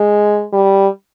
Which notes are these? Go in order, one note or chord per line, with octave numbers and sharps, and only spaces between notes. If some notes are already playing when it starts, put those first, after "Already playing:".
Already playing: G#3
G3